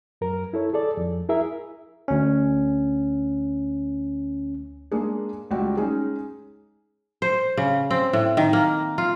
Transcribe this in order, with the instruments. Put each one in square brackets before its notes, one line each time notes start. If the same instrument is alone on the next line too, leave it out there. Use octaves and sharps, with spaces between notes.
[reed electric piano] F#2 A#4
E4 A4 C#5
G#4 A4 D5
F2
E4 G#4 A#4 E5
[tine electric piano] D2 C#4
[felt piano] G#3 A#3 D4 G#4
C#2 G3 F#4 G5
G#3 C#4 D#4 G#4
[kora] C5
C#3
C4
A2
D#3
A#3
F4